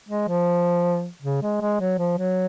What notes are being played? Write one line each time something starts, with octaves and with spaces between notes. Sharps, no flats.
G#3
F3
C#3
G#3
G#3
F#3
F3
F#3